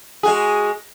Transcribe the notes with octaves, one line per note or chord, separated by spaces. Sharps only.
G#3 F#4 G#4